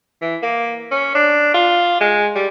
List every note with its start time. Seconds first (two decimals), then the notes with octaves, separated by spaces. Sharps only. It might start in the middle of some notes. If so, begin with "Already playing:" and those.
0.22 E3
0.42 A#3
0.91 C#4
1.15 D4
1.54 F4
2.01 G#3
2.35 G3